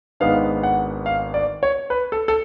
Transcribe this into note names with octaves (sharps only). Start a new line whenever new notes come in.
G#1 G#2 G#3 B3 D4 F5
F#5
F5
D5
C#5
B4
A4
A4